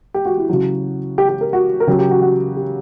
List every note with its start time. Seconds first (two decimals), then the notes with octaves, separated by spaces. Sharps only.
0.14 G4
0.25 F#4
0.38 E4
0.49 C#3 F#3 F#4
1.18 G4
1.29 G4
1.41 A#4
1.53 F#4
1.80 A#4
1.87 C#3 F#3 G4
1.99 G4
2.11 F#4
2.22 F#4
2.57 G4